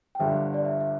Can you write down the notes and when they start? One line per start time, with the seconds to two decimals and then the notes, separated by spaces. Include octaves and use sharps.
0.15 G5
0.20 G1 G2 D3 G3 E5
0.54 D5
0.65 E5
0.81 E5